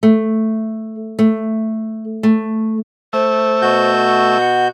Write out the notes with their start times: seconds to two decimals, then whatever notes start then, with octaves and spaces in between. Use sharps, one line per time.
0.03 A3
1.19 A3
2.23 A3
3.13 A3 C5 E5
3.62 B2 F#4 G6
4.39 F#5